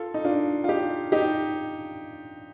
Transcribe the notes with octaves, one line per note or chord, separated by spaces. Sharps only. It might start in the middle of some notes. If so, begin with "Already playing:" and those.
Already playing: F4 A4
D#4
D4 F4
F4
D#4 G4
D#4 G4